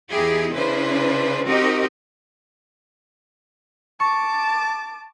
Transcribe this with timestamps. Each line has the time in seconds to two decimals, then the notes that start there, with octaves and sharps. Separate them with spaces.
0.11 E2 B3 D#4 E4 G4 G#4
0.54 C#3 C#4 D4 E4 B4 C5
1.47 C4 D#4 F#4 G4 A#4 D#5
4.00 A5 C#6 D6